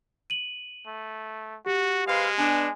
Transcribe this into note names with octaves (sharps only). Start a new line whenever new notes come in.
D#7 F#7
A3
F#4 G4
G#3 B4 C5 F5
B3 D4 G#5